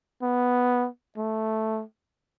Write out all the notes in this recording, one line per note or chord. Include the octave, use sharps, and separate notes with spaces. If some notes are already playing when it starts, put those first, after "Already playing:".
B3
A3